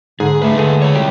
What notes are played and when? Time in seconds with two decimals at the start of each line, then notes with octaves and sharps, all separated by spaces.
0.20 G#2 D3 G#4
0.42 G#3 A3 B4
0.58 D3 A3 G#4
0.82 G#3 C#5
0.94 C2 G4